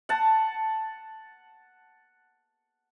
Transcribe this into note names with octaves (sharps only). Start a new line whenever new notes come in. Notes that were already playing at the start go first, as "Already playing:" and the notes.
F#5 A5